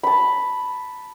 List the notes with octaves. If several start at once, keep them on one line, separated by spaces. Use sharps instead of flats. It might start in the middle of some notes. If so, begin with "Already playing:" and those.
A5 B5